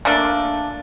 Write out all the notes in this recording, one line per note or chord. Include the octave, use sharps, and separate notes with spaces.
A3 A#3 D4